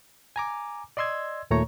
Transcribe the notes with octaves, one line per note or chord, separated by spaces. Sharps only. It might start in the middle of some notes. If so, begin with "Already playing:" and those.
G#5 A#5 D6
D5 D#5 C6 E6 G#6
D#2 A#2 A3 C#5 A#5 C#6